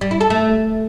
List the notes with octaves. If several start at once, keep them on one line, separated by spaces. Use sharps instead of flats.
G3
E4
A4
A3